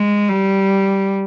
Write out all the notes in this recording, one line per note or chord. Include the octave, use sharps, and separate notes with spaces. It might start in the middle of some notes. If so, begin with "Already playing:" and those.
Already playing: G#3
G3